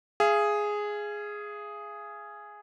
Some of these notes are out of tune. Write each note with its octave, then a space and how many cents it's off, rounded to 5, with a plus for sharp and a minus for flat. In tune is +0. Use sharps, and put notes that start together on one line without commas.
G#4 +0 F5 -40